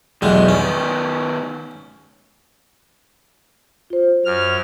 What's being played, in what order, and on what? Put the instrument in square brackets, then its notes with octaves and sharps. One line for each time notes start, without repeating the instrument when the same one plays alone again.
[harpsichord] B1 E2 G#3 [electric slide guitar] D#3 G3 G4
[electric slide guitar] D#3 B3 [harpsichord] C#4
[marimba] F4 C5
[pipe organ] F#2 F6